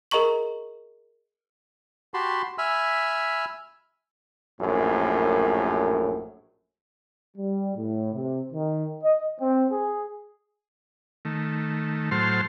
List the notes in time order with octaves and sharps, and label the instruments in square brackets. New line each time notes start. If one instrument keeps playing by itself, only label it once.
[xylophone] G#4 A#4 D#5 A#5 C#6 F#7
[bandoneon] F#4 G4 A5 B5 C6
E5 G#5 B5 E6 F6
[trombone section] A#1 F#2 A2
[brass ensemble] G3
A2
C3
D#3
D#5
C4
G#4
[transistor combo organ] D#3 A3
A2 F#3 C5 A5 C6 F6